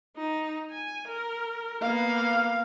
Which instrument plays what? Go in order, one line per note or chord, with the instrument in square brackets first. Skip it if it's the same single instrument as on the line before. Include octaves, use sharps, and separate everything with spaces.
[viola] D#4
G#5
A#4
[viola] A#3 B3 [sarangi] F5